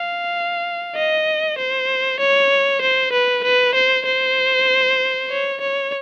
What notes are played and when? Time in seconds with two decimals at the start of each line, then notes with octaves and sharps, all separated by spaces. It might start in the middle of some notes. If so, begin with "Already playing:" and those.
Already playing: F5
0.96 D#5
1.58 C5
2.20 C#5
2.82 C5
3.12 B4
3.44 B4
3.75 C5
4.06 C5
5.30 C#5
5.61 C#5